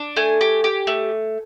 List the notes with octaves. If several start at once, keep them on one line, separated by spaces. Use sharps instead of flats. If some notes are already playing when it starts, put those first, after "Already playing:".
Already playing: D4
A3 G#5
G4
G4
A3